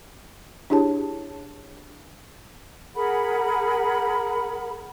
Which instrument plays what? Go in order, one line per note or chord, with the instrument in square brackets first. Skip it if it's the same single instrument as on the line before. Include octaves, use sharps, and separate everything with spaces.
[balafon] D4 E4 G4 G#4 C#5 A5
[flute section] G#4 A#4 F#5 B5